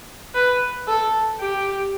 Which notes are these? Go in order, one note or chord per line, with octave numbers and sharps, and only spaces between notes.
B4
A4
G4